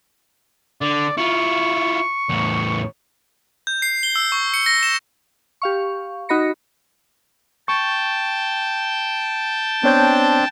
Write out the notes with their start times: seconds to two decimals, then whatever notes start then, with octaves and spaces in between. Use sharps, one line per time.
0.81 D3 D5
1.17 E4 F4 C#6
2.29 E2 A2
3.67 G6
3.82 C7
4.03 G7
4.16 E6
4.32 C#6
4.54 C#7
4.66 A#6
4.83 E7
5.62 G4 F5 C#6
6.29 D#4 F#4 D#5 B5 A#6 C#7
7.68 G5 A5 C#6
9.84 B3 C4 D4 C#5 G6